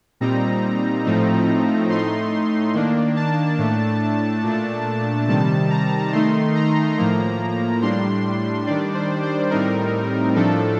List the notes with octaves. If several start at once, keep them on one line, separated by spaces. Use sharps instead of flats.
A#2 G3 C4 D#4 A#5
A2 F3 A3 C4 D#4
A2 A3 D#4 C6
D#3 A#3 D4
A5
A2 A3 D4
A#2 A3 D4
C3 D#3 G3 A5
A#5
D#3 A3 D#4 C6
A#5
A2 F3 A#3 A#5
A2 G3 D4 C6
D#3 G3 D4 D5
C5
C5
A2 G3 C4 D#4 A#4
A2 F3 A3 D4 A4